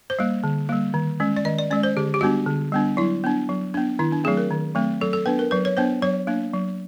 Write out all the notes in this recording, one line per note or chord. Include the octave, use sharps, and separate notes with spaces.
C5
G3 A#3
D3
G3 A#3
D#3
G#3 C#4
D5
D#3 D#5
D5
G#3 C#4 D5
C5
D3 G4
G4
G3 B3 D4 F#4
D3
G3 B3 D4
F#3 E4
B3 D4
F#3
B3 D4
D#3 E4
D4
F#3 A3 C4 G#4
A#4
D#3
F#3 A3 C4
F#3 A4
A4
B3 D4 B4
A#4
F#3 B4
C#5
B3 D4 C5
F#3 C#5
A#3 D4
F#3